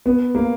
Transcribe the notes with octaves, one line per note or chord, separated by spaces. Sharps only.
B3
A#3